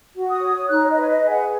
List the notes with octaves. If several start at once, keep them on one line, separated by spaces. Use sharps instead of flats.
F#4
D#6
C#5
D#4 F#6
C#5
D#5
B4
C#5
D#5
G#4
F#5